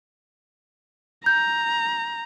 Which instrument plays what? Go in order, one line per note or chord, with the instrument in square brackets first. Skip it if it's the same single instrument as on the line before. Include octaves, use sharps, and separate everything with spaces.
[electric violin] A#5 [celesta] G6